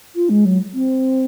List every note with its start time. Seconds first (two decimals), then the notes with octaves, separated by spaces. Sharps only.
0.15 F4
0.29 G#3
0.45 F#3
0.74 C4